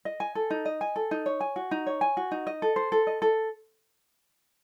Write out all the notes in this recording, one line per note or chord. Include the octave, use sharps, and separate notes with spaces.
D#5
G#5
A4
D#4
D#5
G#5
A4
D#4
C#5
G#5
F#4
D#4
C#5
G#5
F#4
D#4
D#5
A4
C5
A4
D#5
A4